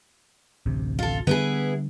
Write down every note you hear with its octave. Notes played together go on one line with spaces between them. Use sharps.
A1 D2 C3
F4 A4
D3 G3 B3 E4 G#4